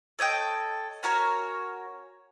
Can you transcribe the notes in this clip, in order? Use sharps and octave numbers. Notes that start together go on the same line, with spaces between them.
A4 C#5 D#5 G5
C#4 F#4 A#4 C#5